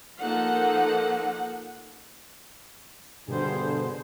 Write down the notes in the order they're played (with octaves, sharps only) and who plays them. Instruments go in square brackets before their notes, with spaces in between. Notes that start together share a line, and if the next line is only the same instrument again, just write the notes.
[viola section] F3 A#3 D#4 A4 F#5
[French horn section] G2 D3 [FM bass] B2 [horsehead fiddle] G#4 C5